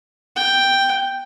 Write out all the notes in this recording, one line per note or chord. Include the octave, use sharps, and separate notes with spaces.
G5